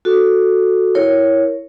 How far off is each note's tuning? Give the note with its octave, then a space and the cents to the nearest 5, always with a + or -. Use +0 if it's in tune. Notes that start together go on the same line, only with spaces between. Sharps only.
F#4 -5 A4 +0
E4 +0 A#4 +0 C#5 +0